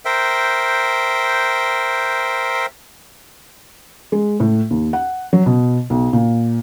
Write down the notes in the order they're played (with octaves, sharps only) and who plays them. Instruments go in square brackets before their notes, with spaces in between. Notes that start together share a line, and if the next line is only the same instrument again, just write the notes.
[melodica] A#4 C5 E5 G5
[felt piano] G#3
A2
D#2
F#5
F#3
B2
B1
A#2